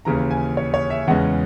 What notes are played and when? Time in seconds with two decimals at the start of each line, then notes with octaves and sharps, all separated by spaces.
0.05 D#2 C#3 E3 A#5
0.31 G#5
0.57 C#5
0.74 C#5
0.90 E5
1.07 E2 C#3 E3 G#3 C#4 F#5